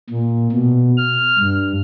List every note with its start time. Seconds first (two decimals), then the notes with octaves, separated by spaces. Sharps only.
0.10 A#2
0.52 B2
0.97 F6
1.39 G2